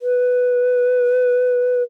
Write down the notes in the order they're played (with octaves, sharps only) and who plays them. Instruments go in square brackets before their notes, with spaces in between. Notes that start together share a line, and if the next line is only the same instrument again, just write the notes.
[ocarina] B4